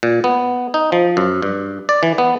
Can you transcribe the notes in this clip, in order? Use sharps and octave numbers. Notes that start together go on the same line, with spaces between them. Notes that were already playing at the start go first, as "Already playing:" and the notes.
A#2
B3
D#4
F3
F#2
G2
D5
E3
B3